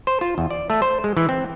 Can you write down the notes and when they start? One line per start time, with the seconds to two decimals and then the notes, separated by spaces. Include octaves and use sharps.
0.07 C5
0.21 F4
0.38 E2
0.51 D5
0.70 A3
0.82 C5
1.04 G#3
1.17 E3
1.29 C4